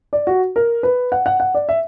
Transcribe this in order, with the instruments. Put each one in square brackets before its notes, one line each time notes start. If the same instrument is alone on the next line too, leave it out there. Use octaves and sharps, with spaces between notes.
[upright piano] D5
F#4
A#4
B4
F#5
F#5
F#5
D5
E5